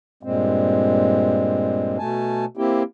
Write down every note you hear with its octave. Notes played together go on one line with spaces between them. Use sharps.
G2 A#2 G#3 C4
B2 A3 G#5 A5
A#3 C4 E4 G4